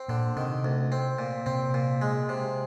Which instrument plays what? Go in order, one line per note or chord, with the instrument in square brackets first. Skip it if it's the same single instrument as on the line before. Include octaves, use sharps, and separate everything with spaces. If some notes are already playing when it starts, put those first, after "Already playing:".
Already playing: [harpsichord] C4
[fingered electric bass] A#2 [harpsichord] D3
[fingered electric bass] C3 [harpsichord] D#3
[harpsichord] D2
C4
A#2
[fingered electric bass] C3 [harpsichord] C4
[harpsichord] A#2
G#3
C3